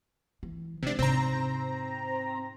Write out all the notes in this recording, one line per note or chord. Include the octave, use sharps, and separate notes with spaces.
E3
C3 G#3 D4
G#2 C3 C4 A#5